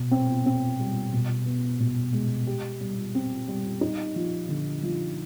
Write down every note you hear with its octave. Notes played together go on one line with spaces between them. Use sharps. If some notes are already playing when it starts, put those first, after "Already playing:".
Already playing: B2
C4
C4
G3
B2
B3
B2
G#3
G4
G3
C4
G3
D#4
F3
D3
F3